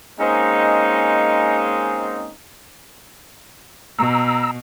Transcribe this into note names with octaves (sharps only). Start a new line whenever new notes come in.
G#3 A#3 C4 C#4 D#4
B2 A#5 E6